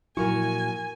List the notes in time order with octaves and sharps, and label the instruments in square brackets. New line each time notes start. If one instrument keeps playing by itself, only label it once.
[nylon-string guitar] A#2 F3 F#3 [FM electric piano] E4 [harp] A#4 C#6 [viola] G#5